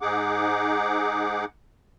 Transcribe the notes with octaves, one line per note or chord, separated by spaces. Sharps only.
G#2 D#4 G#4 F#5 D6